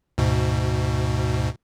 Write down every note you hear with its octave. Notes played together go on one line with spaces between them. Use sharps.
D2 G#2 B2